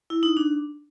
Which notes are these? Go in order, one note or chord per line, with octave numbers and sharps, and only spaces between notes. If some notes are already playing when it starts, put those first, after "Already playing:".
E4
D#4
D4